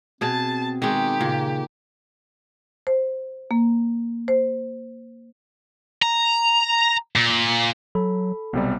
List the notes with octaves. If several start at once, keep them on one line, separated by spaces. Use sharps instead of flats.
B2 C4 G#4 A5
D#3 G#3 G4
A#2 C#3
C5
A#3
C5
A#5
A#2
F#3 A4 B5
B1 C3 G3 B3